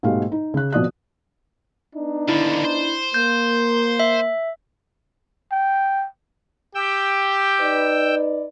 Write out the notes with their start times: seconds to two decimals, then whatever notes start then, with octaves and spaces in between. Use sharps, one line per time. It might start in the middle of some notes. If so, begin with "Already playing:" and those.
0.03 G#2 B2 G3 A3 A4 F5
0.32 D#4
0.54 C#3 F#6
0.73 G#1 B2 F3 D5 D#6 F#6
1.96 B3 D4 D#4
2.29 D#2 D3 E4
2.65 C5
3.14 A#3 G6
4.00 E5
5.52 G5
6.75 G4 G5 E6
7.60 D#4 B4 D5